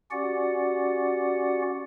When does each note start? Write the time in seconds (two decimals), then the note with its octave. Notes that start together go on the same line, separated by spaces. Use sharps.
0.11 C#4 F#4 G4 D5 F#5